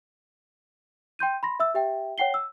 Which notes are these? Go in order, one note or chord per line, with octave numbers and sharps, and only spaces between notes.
G5 C6 G6 D#7
B5 C6 A#6
E5 E6
G4 E5 G5
C#5 F#5 G5 C7 G7
E6